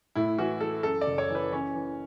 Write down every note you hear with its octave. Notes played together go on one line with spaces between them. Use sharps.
A2 E4
E3 F#4
E3 A4
F#2 A4
D5
F#1
C#5
E3
B4
E3 C#4
E3